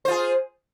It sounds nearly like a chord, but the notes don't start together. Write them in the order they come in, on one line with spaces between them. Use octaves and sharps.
C5 F4 G#4